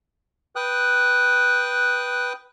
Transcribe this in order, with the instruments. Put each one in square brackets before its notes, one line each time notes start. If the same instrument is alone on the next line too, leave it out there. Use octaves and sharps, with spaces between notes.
[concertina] B4 G5 D#6 F#6